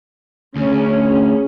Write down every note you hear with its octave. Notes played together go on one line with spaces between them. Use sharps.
D2 C#4 G#4